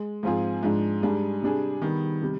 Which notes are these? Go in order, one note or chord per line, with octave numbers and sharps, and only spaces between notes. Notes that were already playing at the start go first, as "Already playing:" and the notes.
Already playing: G#3
G#2 F3 C4 F4 G#4
G#2 F3 G#3 D4
G#2 G3 D4 G#4
C3 G3 D4 G#4
D#3 G3 B3
C3 G3